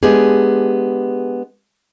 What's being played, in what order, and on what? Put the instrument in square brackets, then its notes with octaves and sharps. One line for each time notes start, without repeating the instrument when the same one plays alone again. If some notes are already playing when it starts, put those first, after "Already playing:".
[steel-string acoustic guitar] G#3 B3 D4 G4 G#4